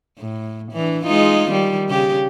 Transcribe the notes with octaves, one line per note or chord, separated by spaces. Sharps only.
A2
E3 D4
G#3 D#4 F4
D#3 G3
C#3 G4